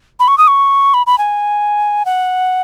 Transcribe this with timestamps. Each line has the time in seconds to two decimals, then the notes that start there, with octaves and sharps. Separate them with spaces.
0.20 B5
0.28 C#6
0.38 D#6
0.48 C#6
0.94 B5
1.07 B5
1.18 G#5
2.06 F#5